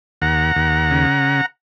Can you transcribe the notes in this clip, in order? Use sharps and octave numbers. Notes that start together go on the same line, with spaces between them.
D#2 F#5 A#5
D#2
C#3